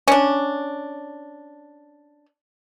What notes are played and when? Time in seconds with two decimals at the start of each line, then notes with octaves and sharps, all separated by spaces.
0.08 C#4 D4